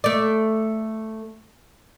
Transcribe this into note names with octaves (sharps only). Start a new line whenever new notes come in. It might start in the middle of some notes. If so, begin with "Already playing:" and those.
A3 D5